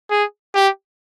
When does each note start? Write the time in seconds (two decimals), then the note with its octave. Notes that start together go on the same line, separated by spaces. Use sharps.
0.11 G#4
0.55 G4